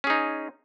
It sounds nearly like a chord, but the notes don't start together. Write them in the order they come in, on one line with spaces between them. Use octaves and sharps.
C#4 G#4 D#4